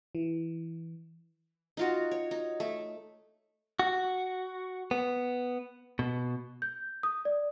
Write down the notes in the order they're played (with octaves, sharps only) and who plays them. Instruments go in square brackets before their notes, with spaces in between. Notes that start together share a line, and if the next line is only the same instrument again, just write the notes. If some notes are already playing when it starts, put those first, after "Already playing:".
[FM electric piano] E3
[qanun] D#4 F4 F#4
C#5
D#4
A3
[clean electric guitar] F#4
B3
B2
[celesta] G6
D#6
D5